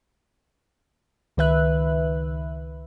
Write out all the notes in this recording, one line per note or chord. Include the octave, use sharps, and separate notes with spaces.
C#2 D#3 B4 E5 F#6